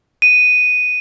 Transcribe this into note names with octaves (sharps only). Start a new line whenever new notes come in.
D#7